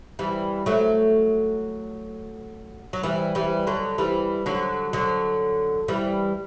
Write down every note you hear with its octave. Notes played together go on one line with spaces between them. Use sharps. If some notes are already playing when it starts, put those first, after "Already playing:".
E3 G3
F#3 A3
F#3
E3 G3
E3 G3
D3 F#3
E3 G3
D3 F#3
D3 F#3
E3 G3